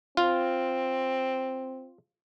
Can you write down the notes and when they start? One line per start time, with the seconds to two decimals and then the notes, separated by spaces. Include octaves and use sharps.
0.17 C4 F4